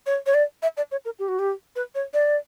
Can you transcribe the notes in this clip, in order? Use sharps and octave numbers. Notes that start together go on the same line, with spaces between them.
C#5
C#5
D5
E5
D5
C#5
A#4
G4
F#4
G4
B4
C#5
D5